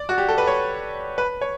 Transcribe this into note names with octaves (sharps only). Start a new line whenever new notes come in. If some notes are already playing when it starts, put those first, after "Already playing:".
Already playing: D5
F#4
G4
A4
B4
C#5
B4
C#5